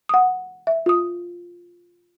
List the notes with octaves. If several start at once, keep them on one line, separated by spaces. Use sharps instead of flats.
F#5 D#6
E5
F4 D#6